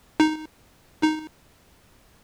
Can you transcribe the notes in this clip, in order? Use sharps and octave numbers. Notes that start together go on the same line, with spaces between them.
D#4
D#4